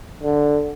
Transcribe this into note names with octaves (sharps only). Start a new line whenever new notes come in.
D3